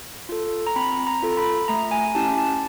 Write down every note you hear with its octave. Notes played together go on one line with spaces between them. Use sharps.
F4 A4
A#5
C4 B5
A#5
F4 A4
B5
A3 A#5
G#5
C#4 E4 G4 A5
A5